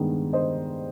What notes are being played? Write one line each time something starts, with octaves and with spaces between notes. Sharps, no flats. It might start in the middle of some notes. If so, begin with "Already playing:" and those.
Already playing: G2 D#3 G#3 B3
C5 D#5